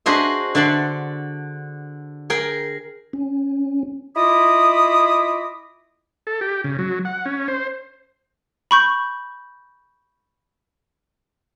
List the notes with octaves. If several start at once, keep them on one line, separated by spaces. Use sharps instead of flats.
D4 F#4 G#4 C5 D#5 E5
D3 D5 E5 F#5 A5 C6
G#4 A#4 G5
C#4
E4 F4 D#5 B5 D6 D#6
A4
G4
C#3
F#3
F#5
C#4
C5
B5 C#6 G6